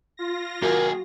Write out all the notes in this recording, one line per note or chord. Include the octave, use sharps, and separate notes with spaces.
F4 A#6
D#2 F#4 G#4 A#4